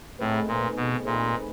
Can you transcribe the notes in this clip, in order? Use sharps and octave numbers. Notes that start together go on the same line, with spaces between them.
A2 A3 C4 D#4 G#4 B4
A#2
B2
A#2 A3 C4 D#4 G#4 B4